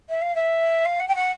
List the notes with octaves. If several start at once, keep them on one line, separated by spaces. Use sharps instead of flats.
E5
F5
E5
F5
F#5
G5
F#5